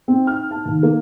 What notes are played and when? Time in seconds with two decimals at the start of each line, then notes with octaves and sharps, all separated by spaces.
0.08 C4
0.27 F6
0.51 A5
0.65 D#2
0.83 A#3